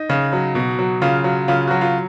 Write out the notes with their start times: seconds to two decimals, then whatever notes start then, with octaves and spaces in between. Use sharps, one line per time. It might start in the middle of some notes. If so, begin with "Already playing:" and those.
Already playing: D#4
0.10 C#3
0.33 F#3
0.55 B2
0.79 F#3
1.02 C#3 F4
1.24 F#3
1.48 C#3 F4
1.67 F#3 F#4
1.81 F4